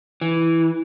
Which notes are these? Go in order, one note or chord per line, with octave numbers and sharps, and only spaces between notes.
E3